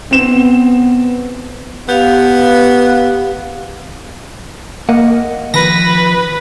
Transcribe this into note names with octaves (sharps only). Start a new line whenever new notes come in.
B3 C4 E7
B3 G4 F5
A#3 D#5 F#5
D#3 F3 B4 A#6